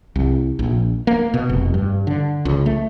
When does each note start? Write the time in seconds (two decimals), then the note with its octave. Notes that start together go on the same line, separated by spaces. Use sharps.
0.16 C2
0.59 A#1
1.07 A#3
1.34 B2
1.49 F1
1.74 G2
2.07 D3
2.45 C#2
2.66 A3